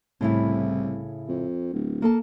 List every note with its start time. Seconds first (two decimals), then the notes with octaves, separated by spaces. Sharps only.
0.21 C2 A2 C#3 E4
1.28 F2
1.73 D1
2.02 A#3 A4 A5